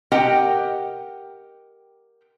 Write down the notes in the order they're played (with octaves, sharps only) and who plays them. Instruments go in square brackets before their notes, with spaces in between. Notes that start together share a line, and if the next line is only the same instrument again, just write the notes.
[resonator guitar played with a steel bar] G4 A#4 D#5 F#5 G5